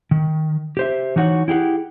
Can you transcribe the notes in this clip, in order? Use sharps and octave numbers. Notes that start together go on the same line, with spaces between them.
D#3
G4 C5 E5
E3 D#4 F#4 C#5 F#5
E4 G4 G#4 F#5